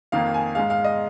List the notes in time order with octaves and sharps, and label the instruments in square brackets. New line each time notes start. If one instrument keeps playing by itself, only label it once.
[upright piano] F2 D#3 A#3 F5
G#5
G#2 G#3 F5
F5
D#5